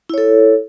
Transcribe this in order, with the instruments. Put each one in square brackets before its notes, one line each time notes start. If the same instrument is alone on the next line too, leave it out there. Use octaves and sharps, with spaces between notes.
[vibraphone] E4
C#5
A4